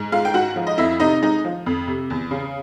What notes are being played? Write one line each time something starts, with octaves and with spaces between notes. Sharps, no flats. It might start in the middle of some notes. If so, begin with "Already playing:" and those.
Already playing: G#2
G#3 F4 F5
G5
G#2 F#4 F#5
F3
D#5
F2 E4 E5
C3 D#4 D#5
G#3 D#4 D#5
F3
F2
C3
E2
C#3